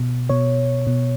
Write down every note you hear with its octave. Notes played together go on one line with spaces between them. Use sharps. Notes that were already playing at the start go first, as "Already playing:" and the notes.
Already playing: B2
B2 C#5
B2